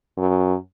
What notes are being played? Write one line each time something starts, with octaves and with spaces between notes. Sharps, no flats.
F#2